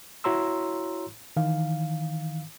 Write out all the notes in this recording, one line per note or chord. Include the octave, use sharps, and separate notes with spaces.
E4 F#4 C#5 A#5 C6 E6
D#3 E3 F5